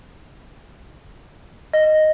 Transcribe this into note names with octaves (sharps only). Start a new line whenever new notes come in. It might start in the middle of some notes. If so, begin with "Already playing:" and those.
D#5